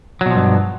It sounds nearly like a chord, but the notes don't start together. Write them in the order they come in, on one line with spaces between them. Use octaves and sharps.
F#3 B2 F3 G2